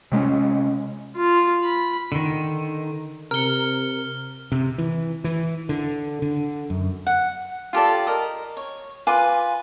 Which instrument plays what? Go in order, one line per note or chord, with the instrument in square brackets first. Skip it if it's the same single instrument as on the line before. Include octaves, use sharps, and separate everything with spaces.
[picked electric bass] C3 G#3 A#3 C#4
[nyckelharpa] F4
B5
[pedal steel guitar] D3 D#3
[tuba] C3 [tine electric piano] A#4 C#7 [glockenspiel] F6 G7
[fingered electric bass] C3
E3
E3
D3
D3
F#2
[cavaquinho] F#5
F4 G4 A4 D5
A#4 D#5
C#5
F4 B4 G#5 D6